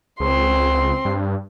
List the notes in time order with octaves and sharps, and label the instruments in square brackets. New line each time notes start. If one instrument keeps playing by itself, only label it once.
[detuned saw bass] C#2 [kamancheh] C4 C6
[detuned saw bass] G2